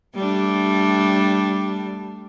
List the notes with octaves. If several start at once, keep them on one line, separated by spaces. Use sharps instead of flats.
G3 A3 D4